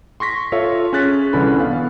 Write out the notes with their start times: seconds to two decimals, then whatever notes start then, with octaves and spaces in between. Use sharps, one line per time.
0.20 C6 C#6 A#6 B6
0.52 F4 A4 C#5 E5 F5
0.93 C#4 G#4 F#6 A6 B6
1.33 C2 D3 E3 C#4 A4 B5
1.58 B3 F5